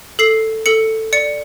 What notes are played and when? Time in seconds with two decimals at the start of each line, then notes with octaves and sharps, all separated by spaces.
0.19 A4 C7
0.66 A4 C#7
1.13 D5 C#7